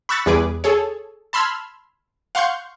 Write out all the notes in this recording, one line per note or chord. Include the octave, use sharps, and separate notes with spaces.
B5 C#6 E6 F#6 A6
E2 G3 G#4 B4 D6
G#4 A4 C#5
A5 B5 C6 E6 F6 G#6
F5 F#5 C6 C#6 G6